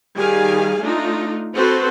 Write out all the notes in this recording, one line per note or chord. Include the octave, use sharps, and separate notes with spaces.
D#3 G3 G#4 F5 G#5
A3 D4 D#4 F4
C4 F#4 A4 B4 C5